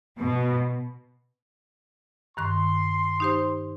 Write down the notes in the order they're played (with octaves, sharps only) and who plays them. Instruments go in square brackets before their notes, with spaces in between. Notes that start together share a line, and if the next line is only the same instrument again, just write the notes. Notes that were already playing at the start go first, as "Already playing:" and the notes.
[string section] B2
[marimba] G2 D#3 C#6 [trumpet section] C6
[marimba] D#4 G4 C5